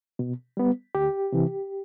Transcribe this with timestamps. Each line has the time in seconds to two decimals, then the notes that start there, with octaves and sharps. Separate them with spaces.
0.19 B2
0.57 G3 B3
0.95 D2 G4
1.32 C3 E3